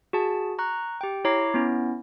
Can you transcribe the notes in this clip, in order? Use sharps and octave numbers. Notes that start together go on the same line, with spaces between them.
F#4 G#4 A5
A#5 C#6 F#6
G4 G5
E4 C#5 A#5 D6 C7
B3 C#4 E4